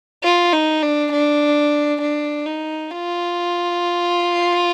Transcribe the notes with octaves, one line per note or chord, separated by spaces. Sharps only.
F4
D#4
D4
D4
D4
D#4
F4